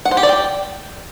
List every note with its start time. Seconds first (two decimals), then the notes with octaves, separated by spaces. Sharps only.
0.05 F#5
0.11 C5
0.17 G4
0.23 D5
0.29 G5